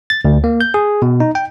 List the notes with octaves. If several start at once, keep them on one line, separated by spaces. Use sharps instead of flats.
A6
D2
A#3
G6
G#4
B2
D#4
G5